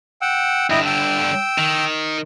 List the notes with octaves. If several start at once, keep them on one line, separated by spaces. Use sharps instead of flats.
F#5 G5 E6
G2 D3 E4 D#5 G5
G5 E6
D#3